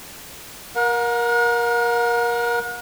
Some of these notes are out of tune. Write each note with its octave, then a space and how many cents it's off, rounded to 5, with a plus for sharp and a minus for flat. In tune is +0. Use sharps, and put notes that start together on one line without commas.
A#4 +20 F#5 -45